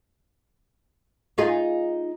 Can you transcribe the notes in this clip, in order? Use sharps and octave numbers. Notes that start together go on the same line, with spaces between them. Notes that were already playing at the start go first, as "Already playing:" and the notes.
D#4 F4 G#4